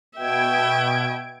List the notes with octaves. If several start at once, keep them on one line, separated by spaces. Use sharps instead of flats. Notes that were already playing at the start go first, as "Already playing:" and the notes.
B2 E5 G5 G#6 D7